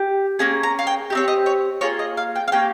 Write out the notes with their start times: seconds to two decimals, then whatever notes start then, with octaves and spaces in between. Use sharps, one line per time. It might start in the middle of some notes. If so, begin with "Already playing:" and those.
Already playing: G4
0.39 A#3 C#4 G#4
0.63 A#5
0.79 F5
0.87 G5
1.10 D#4 G4
1.15 C4 C#5
1.28 D#5
1.46 C#5
1.81 A#3 F4 G#4 C#5
1.99 D#5
2.17 F5
2.36 G5
2.48 F5
2.52 A#3 C#4 G4 G5